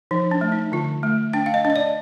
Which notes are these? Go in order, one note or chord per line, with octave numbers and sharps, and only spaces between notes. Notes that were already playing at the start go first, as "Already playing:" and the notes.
F3 D#4
D4
A3
D#4
D3 F4
A3
D4 G5
F5
D#5
D4
D#5
D5